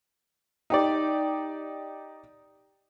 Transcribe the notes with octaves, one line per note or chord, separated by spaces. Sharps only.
D#4 G4 D5